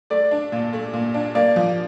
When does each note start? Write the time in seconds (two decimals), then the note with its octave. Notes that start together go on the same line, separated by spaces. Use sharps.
0.10 A3 D5
0.31 D4
0.52 A#2
0.73 A3
0.93 A#2
1.14 D4
1.35 A#3 D5
1.56 F3